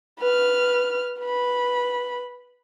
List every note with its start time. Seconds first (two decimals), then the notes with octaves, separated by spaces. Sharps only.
0.19 B4 F6
1.21 B4 B5